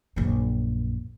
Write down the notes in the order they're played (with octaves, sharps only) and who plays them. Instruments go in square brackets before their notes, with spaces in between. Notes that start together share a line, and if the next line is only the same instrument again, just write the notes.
[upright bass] A#1 F#2